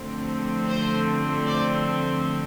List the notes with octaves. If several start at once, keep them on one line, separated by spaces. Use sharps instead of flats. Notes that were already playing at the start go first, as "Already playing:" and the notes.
Already playing: D3 F3 A3 C4
C5
D5